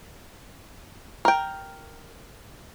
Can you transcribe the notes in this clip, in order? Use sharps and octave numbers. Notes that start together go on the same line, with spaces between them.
A#4 G5